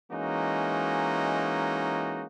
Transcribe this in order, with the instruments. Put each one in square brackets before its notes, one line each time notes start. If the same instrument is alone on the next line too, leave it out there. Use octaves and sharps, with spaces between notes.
[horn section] E3 G#3 A#3 C#4 D#4 F#4